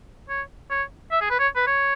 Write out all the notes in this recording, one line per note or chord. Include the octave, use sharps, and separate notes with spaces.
C#5
C#5
E5
G#4
B4
C#5
B4
C#5